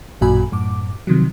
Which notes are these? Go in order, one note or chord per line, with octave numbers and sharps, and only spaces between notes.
A1 F#2 A#2 F#4 G#5 B5
F#2 A2 D6
C3 D#3 F3 F#3